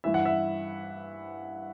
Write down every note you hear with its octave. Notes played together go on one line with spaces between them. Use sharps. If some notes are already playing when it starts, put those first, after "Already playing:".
G2 E3 E5
F#5
E5